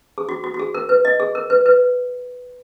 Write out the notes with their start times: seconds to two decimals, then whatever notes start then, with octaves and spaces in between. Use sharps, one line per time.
0.18 G#4
0.29 F#4
0.44 F#4
0.54 F#4
0.59 G#4
0.74 A#4
0.89 B4
1.05 D#5
1.20 G#4
1.35 A#4
1.50 B4
1.66 B4